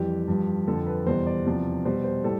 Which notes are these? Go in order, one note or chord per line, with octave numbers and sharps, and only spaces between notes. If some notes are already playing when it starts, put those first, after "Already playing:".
Already playing: F2 E3 G3 G4
G2 F3
F2 D3 F3 A4
B4
E2 B2 G3 C5
D5
E2 C3 F3
B2 G3 C5
C5
A2 G3 A4